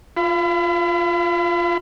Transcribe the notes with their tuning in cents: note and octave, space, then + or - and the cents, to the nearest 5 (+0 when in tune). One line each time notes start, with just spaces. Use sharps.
F4 +0 F5 -40 B5 +35